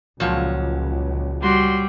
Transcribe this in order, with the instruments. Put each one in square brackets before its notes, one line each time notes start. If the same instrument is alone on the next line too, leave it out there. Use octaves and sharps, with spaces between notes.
[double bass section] C#2 [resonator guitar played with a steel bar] A#2 F3 F#3
[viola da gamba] G3 [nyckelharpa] F#4 C6